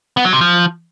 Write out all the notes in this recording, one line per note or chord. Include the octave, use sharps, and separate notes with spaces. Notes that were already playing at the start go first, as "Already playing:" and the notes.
B3
F#3
C3
F3